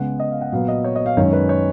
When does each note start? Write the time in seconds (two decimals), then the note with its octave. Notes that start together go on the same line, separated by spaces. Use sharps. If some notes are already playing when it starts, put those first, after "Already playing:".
Already playing: C#3 G#3 B3 F#5
0.20 D#5
0.31 F5
0.41 F#5
0.52 A#2 F#3 B3 F5
0.68 D#5
0.84 C#5
0.96 D#5
1.06 F5
1.17 F#2 D#3 G#3 C#4 C#5
1.33 B4
1.49 C#5